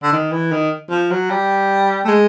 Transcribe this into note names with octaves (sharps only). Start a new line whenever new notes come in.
D3
D#3
E3
D#3
F3
F#3
G3
A3
G#3